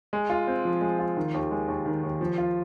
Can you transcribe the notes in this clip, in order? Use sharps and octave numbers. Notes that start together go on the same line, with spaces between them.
G#3
F4
C4
F3
G#3
F4
D#3
D#2
G#3
D#2
D#3
D#2
F3
F4